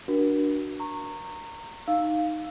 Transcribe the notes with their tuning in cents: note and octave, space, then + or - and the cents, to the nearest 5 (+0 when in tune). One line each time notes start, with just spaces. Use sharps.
D4 +0 F#4 +0 A#4 +35
A#5 -25 C#6 -15
D#4 +0 F5 +0 E6 +0